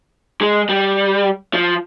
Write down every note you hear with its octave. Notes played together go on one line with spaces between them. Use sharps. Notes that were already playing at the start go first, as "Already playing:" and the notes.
G#3
G3
F3